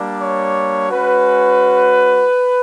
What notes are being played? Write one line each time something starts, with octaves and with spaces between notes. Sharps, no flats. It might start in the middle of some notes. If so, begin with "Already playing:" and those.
Already playing: G3 A#3 D4
C#5
G#3 C#4 F#4 B4